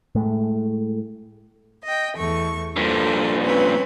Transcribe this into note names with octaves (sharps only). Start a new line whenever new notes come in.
A2 G#3 A3
D#5 G5
E2 A3 C#6
G2 A#2 A4 C5
C4 C#4 B4